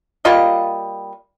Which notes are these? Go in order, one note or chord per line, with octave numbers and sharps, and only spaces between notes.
G3 A#3 F4 D#5